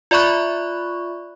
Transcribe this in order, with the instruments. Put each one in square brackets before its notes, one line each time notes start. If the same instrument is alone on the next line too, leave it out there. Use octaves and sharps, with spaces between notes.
[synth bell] F4 D5 E5 B5 C#6 F#6